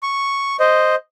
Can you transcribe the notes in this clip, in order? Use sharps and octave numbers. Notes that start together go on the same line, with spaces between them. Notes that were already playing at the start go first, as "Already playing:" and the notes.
C#6
C5 D#5